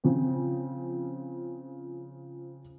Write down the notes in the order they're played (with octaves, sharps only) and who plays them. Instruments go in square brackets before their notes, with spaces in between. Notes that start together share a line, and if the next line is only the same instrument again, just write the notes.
[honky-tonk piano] C#3 F3 C4